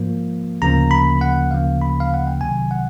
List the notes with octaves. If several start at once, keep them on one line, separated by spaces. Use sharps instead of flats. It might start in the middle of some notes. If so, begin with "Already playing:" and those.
Already playing: G#2 F3 A#3
D2 C#3 F3 A#3 A#5
B5
F#5
D2 C#3 F3 A#3 F5
B5
F5
F#5
G5
C2 C3 D#3 F#3 G#5
F#5